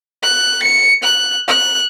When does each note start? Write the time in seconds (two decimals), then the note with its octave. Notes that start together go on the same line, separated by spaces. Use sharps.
0.23 F#6
0.63 C#7
1.03 F#6
1.48 F#6